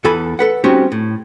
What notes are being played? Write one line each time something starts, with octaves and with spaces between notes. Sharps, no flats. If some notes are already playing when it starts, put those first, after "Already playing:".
E2 E3 A4 G#5 B5
A4 B4 F#5
G3 C4 C#4 D#4 F#4 G4
A2